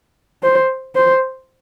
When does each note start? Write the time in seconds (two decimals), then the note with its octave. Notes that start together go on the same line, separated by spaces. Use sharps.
0.43 C5
0.95 C5